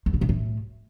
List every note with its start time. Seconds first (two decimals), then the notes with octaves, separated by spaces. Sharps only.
0.06 E2
0.14 B2
0.21 C3
0.29 A2